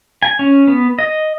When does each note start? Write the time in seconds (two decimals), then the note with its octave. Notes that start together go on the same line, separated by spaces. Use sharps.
0.23 G#5
0.39 C#4
0.67 B3
0.99 D#5